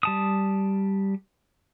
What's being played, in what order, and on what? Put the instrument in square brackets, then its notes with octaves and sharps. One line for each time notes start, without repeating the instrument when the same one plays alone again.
[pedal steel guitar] G3 A5 D#6